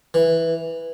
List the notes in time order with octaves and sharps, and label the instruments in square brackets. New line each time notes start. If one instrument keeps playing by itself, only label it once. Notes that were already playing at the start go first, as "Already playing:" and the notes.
[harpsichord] E3